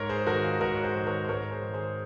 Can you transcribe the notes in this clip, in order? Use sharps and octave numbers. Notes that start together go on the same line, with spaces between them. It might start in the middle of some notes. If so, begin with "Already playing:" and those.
Already playing: G#2 A#4 C#5
G#4 C5
D#3 F#4 A#4
F4 G#4
G#2 F#4 A#4
C#5
G#4 C5
D#3
A#4 C#5
C5
G#2 A#4 C#5
G#4 C5
D#3
G#4 C5